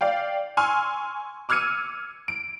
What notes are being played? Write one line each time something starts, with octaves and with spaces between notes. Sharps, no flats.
D5 F5 G5
G#5 C6 C#6 E6 F6
D6 E6 F6 G#6 C#7 D#7
D7